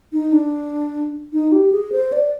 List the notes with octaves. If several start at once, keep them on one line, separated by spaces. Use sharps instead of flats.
D#4
D4
D#4
G4
G#4
C5
D5